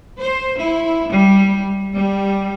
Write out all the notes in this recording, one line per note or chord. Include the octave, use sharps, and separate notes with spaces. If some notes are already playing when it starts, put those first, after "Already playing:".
C5
E4
G3
G3